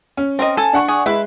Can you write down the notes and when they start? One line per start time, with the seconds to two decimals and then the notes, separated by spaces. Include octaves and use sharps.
0.17 C#4
0.39 C4 A#4 D#5
0.57 A4 G#5
0.73 D4 F#5 C#6
0.88 G#4
1.06 G#3 E4 B4